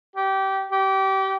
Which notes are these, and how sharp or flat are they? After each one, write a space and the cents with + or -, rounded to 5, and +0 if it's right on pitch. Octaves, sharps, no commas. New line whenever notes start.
G4 -20
G4 -25